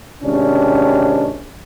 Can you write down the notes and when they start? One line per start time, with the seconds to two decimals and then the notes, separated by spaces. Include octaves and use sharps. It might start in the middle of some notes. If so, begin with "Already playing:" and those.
0.22 G#1 C3 C#4 D4